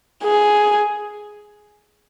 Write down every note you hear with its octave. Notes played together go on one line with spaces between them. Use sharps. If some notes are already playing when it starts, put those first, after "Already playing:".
G#4